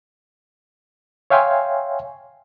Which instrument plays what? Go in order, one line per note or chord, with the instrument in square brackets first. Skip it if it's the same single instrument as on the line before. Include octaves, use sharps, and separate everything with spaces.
[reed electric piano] C#5 E5 F5 G5 G#5 C6